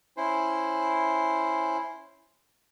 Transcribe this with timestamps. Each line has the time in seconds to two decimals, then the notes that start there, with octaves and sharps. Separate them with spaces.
0.17 C#4 E4 C5